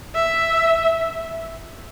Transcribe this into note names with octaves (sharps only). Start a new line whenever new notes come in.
E5